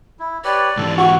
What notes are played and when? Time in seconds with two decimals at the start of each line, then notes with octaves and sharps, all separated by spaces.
0.19 E4
0.44 G4 B4 C#5 D5
0.78 G#2 E3 A4
0.98 F#4 F#5 C#6